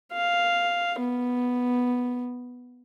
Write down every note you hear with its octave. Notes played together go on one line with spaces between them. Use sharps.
F5
B3